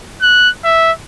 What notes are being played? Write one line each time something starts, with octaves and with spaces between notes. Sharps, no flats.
F#6
E5